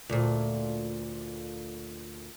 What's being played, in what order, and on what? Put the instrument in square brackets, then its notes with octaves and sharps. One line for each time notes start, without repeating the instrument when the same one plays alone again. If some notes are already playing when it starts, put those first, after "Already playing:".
[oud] D2 A#2